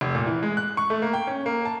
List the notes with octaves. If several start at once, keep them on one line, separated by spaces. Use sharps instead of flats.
F1
A#2
E3
G#3
F#6
C#6
A3
A#3
G5
C#4
A#3
A5